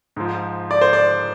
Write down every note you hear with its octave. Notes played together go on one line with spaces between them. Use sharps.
G#2 F3
D5
C5
D5